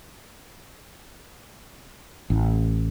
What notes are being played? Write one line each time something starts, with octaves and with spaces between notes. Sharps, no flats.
A1